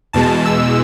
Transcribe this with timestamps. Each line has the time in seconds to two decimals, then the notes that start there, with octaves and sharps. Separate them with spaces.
0.13 E2 B2 G#3 A5
0.45 E6